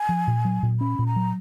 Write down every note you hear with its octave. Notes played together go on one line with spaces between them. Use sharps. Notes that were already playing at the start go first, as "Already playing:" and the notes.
Already playing: G#5
F3
A#2
F#3
A#2
C#4 B5
A#2
A#5
F#3